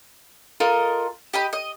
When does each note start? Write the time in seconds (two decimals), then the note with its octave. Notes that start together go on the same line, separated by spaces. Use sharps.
0.60 F4 A4 A#4 D#5
1.33 G4 D#5 B5
1.53 D#5